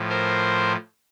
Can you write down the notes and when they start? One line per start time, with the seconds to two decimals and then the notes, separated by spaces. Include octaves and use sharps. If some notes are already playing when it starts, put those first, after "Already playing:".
Already playing: A2 F3
0.09 A#4 C5